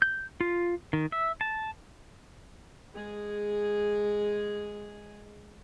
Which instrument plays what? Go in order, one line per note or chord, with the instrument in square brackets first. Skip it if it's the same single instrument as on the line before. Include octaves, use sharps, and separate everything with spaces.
[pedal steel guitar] G6
F4
D#3
E5
A5
[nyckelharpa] G#3 G#4